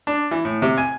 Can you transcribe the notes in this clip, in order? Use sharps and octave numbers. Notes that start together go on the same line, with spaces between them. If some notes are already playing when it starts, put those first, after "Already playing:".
D4
E3
A2
C3
G#5